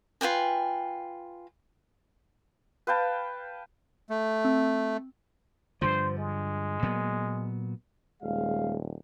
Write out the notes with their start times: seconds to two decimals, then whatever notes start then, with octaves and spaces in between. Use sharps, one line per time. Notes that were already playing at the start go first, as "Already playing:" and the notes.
0.21 F4 B4 G5 G#5
2.87 B4 F5 G5 A5
4.10 A3
4.45 C4
5.82 G2 D3 F3 C5
6.17 G#3
6.83 A#2 F#3 B3
8.23 D#1 G#3 F5